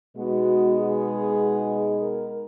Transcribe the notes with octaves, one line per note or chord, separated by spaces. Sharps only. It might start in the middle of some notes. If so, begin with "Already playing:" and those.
B2 G#3 B3 D#4 F#4
G#4
A#4